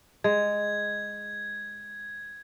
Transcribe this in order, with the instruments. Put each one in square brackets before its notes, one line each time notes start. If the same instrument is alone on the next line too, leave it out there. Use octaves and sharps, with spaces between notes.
[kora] G#3 [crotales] G#6